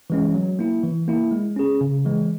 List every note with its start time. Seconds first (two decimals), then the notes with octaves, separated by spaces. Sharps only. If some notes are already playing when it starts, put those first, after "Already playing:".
0.10 E3 G#3 C#4
0.35 F#3
0.59 A#3 E4
0.83 E3
1.08 A#3 E4
1.31 G#3
1.56 C#4 G#4
1.81 C#3
2.05 E3 G#3